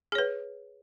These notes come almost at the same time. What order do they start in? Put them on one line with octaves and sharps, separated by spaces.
G#4 C#5 B4